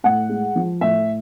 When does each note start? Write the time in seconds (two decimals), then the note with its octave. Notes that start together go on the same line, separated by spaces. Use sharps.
0.04 A2 F#5
0.29 G#3
0.56 F3
0.81 A2 E5